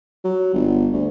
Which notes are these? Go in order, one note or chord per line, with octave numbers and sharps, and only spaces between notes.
F#3
G1
D2